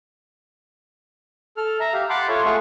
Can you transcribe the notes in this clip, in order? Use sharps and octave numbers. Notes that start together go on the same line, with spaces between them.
A4 F6
E5 A#5
G4 F5
F#5 A5 B5 C6 D6
F4 A4 C#5 E5
A3 F4 G#4 F#5 C#6